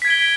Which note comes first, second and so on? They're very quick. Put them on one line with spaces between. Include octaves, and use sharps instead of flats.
B6 G#6 D7 G7